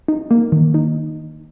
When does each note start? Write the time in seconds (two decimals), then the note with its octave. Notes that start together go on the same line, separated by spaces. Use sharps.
0.08 D#4
0.31 A#3
0.52 D#3
0.74 D#4